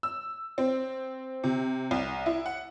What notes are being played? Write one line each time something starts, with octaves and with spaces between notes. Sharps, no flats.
E6
C4
C3
C2
E4
F#5